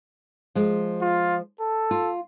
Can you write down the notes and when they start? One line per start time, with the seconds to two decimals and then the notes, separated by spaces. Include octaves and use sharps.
0.55 F3 G#3
1.01 F4
1.60 A4
1.91 F4